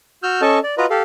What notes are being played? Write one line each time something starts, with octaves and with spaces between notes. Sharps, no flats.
F#4 E6 F6 G6
C#4 A4 D#5 A5 C#6
D5
F4 F#4 B4 D#5 A#5
G4 A4 F5